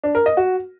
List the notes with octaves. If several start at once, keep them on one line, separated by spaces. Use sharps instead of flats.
D4
A#4
D#5
F#4